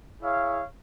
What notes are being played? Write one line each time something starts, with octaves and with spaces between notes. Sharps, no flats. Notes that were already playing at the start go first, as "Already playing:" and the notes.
E4 G#4 C#5 F5